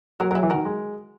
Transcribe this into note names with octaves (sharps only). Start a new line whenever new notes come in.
F#3 F#4 A#4
F#3 A#4
E4 G#4
E3
D#3 F#4 A#4
G#3